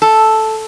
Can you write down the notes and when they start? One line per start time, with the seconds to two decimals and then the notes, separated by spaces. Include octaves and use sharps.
0.02 A4